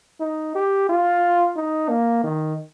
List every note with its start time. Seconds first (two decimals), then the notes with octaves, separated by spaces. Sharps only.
0.20 D#4
0.55 G4
0.89 F4
1.56 D#4
1.89 A#3
2.24 D#3